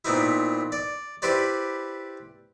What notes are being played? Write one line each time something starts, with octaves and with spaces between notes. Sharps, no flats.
A#2 B3 C4 D#4 E4
D5
E4 G4 B4 C5 D5